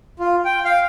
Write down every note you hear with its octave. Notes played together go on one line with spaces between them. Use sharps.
F4
G5
F5